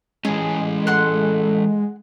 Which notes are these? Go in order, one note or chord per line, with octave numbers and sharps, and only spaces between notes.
E3 G#3 C#4 G#4
A4 F#5 C6 F#6